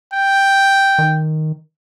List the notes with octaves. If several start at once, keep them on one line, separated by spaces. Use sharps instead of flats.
G5
D#3